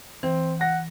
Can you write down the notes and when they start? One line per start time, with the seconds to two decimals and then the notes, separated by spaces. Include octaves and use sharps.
0.23 E3 C4
0.61 F#5 A#6